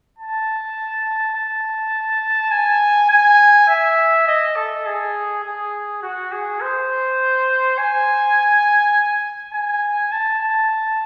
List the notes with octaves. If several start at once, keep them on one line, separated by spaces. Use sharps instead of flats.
A5
A5
G#5
G#5
E5
D#5
A4
G#4
G#4
F#4
G#4
C5
G#5
G#5
A5
A5